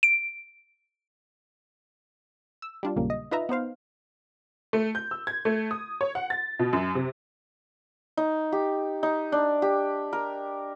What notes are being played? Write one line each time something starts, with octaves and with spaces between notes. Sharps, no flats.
D7
E6
G3 D4 F4
A#1 F#2 A#2 C#3 G3 A#3
D#5
D#4 F4 B4 D#5 E5 A#5
B3 D#4 C5 F5
A3
G6
E6
G#6
A3
D#6
C#5
F#5
A6
B2
F#2
C3
D#4
G4
D#4
D4
G4
A#4